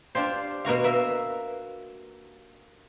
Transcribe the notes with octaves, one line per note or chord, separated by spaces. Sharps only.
D4 F4 G4 C5
B2 A#3 F#4 F5
A#3 E5